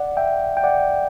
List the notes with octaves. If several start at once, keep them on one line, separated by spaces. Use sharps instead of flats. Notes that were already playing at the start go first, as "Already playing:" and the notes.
Already playing: D5 F#5
E5 G5
G5
D5 F#5